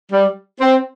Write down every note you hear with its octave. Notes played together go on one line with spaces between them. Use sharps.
G3
C4